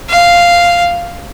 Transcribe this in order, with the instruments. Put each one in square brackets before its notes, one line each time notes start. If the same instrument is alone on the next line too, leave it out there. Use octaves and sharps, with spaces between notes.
[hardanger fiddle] F5